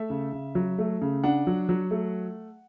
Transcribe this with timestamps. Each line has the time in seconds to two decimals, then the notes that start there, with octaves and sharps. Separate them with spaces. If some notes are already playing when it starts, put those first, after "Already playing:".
Already playing: A3 E5
0.10 C#3
0.33 C#3
0.55 F#3
0.78 A3
1.01 C#3
1.24 D4 F#5
1.47 F#3
1.69 F#3
1.91 A3